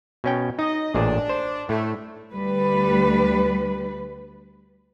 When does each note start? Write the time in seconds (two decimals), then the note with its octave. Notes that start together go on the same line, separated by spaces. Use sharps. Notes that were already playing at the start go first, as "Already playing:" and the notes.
0.24 B2 C#4 G5
0.59 D#4 D#5
0.95 A1 A#2 D4 G#4
1.29 C5
1.69 A2 A3
2.33 D2 G3 B4